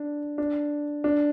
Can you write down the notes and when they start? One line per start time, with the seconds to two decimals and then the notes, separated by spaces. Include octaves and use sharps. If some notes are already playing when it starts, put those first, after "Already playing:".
Already playing: D4
0.38 D4
1.04 D4